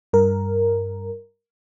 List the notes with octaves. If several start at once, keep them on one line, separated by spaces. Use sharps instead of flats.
G2 A#4